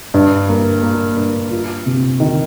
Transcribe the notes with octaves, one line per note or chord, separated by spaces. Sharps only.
G2
A#3
A#3
G2
F4
C3
D#3